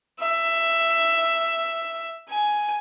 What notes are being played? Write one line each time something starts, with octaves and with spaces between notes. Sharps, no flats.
E5
G#5